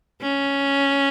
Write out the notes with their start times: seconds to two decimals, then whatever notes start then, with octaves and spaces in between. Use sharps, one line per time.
0.22 C#4